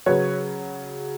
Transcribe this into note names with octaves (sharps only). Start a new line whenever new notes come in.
C#3 F#3 B4 C#5